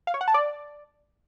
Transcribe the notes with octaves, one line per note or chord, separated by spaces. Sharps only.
F5
C#5
F#5
A5
D5